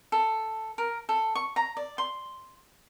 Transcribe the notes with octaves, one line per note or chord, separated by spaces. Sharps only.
A4
A#4
A4
C#6
A#5
D5
C6